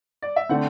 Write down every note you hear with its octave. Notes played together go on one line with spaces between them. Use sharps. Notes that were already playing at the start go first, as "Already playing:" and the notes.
D5
E5
D3 A3 C4 F#5